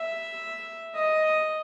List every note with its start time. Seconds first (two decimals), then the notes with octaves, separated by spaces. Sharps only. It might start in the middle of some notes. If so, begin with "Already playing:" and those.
Already playing: E5
0.95 D#5